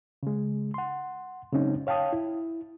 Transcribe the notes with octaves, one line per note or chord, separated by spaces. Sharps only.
C#3 G#3
F#5 C6
C#3 F#3 G#3 C4 C#4 D#4
C#5 F5 G5 A5 D#6
E4